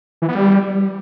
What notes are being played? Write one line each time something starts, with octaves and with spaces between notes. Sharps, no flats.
E3
B3
G3